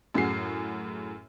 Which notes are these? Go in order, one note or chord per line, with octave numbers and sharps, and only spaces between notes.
F#2 A2 F#4 G#4 C7